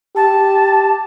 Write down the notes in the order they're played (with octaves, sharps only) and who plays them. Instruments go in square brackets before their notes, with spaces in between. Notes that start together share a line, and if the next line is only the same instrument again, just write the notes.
[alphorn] G4 [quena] A5